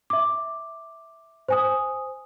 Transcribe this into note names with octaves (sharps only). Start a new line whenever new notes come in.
E5 D6
C5 G#5 D#6